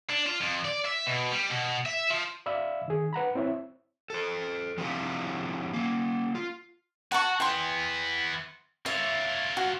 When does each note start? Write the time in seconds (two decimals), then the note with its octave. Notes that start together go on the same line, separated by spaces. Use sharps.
0.10 D4
0.26 F4
0.40 F2
0.65 D5
0.85 E5
1.06 B2
1.32 G3
1.51 B2
1.86 E5
2.10 F3
2.46 D5 E5 F5 B5 E6
2.88 D#3 G#4
3.13 B4 F#5 A#5 B5
3.35 C4 E4 C#5 E5
4.10 A4 C5
4.78 F3 C4 D4 E4 G4 F5
5.73 A#3 C#4
6.35 F4
7.12 F#4 F#5 A5 C#6
7.40 E3 B3 G5 C6
8.86 F4 C#5 E5
9.57 F#4